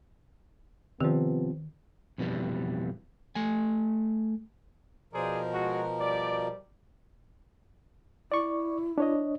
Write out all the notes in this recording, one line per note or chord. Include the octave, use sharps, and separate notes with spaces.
C3 D#3 F3 B3
F2 B2 E3 G3
A3 G#5
B2 F3 G#4 A#4 C5 D5
G#3 F#4
G3 D5
E4 D5 C#6
D4 C#5 D#5